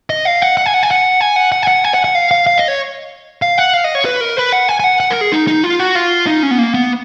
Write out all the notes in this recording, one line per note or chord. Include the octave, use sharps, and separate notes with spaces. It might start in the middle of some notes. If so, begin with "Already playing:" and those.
D#5
F5
F#5
F#5
G#5
F#5
G#5
F#5
G#5
F#5
F#5
G#5
F#5
G#5
F#5
F#5
F5
F5
F5
D#5
C#5
F5
F#5
F5
D#5
C#5
B4
A#4
B4
F#5
G#5
G#5
F#5
F#5
A#4
G#4
D#4
D#4
F4
F#4
F4
D#4
C#4
B3
A#3
B3